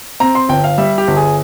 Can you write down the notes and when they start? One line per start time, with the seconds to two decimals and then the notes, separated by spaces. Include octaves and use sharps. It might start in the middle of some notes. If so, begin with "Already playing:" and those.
0.20 C4 A#5
0.35 C6
0.49 G1 G5
0.64 F5
0.78 G3 E5
0.98 G4
1.08 G1
1.17 G#4